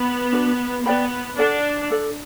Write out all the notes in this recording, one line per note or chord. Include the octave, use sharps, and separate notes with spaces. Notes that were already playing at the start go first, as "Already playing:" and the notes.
Already playing: B3
D4 F#4 B4
B3 B4 D5 G5 B5
D4 A4 D5 F#5
D4 A4 D5